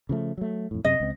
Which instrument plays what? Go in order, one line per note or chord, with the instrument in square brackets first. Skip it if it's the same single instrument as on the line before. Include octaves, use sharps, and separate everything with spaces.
[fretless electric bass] C#3 F3 A3
F#3 A3
F2 A2
[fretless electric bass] F#2 C3 [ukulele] D#5
[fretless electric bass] C#2 C4